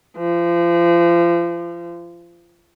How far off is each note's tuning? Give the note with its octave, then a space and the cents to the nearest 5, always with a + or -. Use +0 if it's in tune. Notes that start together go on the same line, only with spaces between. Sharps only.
F3 -30